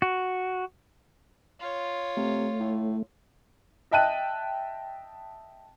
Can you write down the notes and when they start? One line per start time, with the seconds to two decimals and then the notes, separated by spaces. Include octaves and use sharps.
0.02 F#4
1.60 F4 C#5
2.17 C3 A3
2.60 A2
3.91 D#5 E5 G5 A5 F#6 D#7